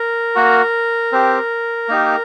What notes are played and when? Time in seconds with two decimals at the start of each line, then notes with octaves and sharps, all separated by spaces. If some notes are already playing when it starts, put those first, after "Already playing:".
Already playing: A#4
0.35 A#3 F#4
1.12 C4 G4
1.89 A#3 D#4 G4